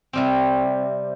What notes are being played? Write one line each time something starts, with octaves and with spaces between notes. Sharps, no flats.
C3 G3 C4